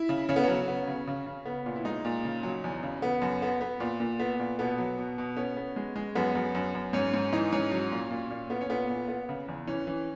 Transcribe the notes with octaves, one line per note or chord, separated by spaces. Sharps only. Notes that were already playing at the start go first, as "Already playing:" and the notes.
Already playing: E4
C#3
C#3 C#4
B3
F#3 C#4
B3
C#3
C#3
C#3
B3
A#2
E4
G#3 D#4
A#2
C#3
F#3
E2
C#3
B3
F#2
B3
B3
A#2
A#2
B3
A#2
B2 B3
F#3
B2
B2
B3 C#4
B3
G#3
G#3
F#2 B3
F#2
F#2
F#2
G#2 C#4
G#2
E3 D#4
G#2 C#4
F#3
A#2
A#2
A#2
B3
C#4
A#2 B3
A#2
B3
C#3
E2
E3 C#4
E3